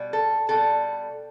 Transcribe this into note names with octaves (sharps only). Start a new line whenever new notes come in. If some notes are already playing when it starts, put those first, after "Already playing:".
Already playing: B2 G3
A4
B2 G3 A4